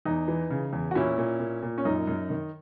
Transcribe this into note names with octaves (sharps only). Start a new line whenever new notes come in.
E2 D#4
E3
C#3
E2
F#4
A#2 C#4 E4
A#2
A#2
A#2
C#4
F#2 D#4
F#2
D#3